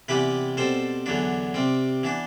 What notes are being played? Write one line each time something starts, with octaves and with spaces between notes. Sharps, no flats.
C3 E3 G3 B3 G4 B4
B2 G3 C4 A4 C5
E2 D3 F#3 B3 D4
C3 G3 C4
E3 B3 D4